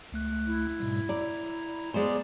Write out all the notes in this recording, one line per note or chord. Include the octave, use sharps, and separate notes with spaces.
C#2 A3 F#6
E4
G#2 B2 G3
D5 A#5
G#3 B3 C5 D5